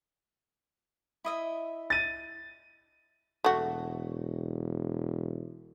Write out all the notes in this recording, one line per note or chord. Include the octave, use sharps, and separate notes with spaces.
E4 D#5 E5
A6 D#7
E1 A3 F#4